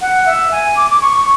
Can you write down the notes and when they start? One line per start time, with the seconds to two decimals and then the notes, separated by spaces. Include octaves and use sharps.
0.01 F#5
0.25 E5
0.52 G#5
0.76 D6
0.90 D6
1.01 C#6